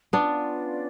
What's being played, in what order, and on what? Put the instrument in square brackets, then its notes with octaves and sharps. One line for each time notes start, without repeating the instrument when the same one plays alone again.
[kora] B3 D4 [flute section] C#4 F4 B4 D5